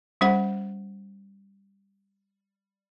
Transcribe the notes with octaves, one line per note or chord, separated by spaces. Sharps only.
G3 C#4 C5 F#5